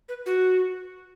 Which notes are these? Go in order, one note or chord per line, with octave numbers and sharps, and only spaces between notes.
B4
F#4